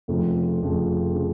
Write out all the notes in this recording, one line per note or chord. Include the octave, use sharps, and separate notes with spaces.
F1 F2 C#3 F3
F1 F2 C#3 F3
C#3 F3